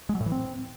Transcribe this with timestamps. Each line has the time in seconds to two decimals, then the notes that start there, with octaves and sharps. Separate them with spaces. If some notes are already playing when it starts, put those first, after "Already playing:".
0.09 G#3
0.15 F#3
0.21 A2
0.26 E3
0.32 C4